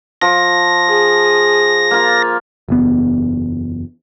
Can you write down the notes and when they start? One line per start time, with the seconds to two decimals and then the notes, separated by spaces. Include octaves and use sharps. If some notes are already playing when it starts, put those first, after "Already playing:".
0.22 F3 A#6
0.87 G#4
1.91 A#3 F4
2.69 F#1 E2 B3